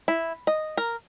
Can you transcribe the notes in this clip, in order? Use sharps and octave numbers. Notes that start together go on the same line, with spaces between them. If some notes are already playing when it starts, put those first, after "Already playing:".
E4
D#5
A#4